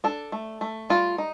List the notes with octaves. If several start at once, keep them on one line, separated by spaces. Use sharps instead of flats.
D4 A4
A3
A3
G3 F4
D#4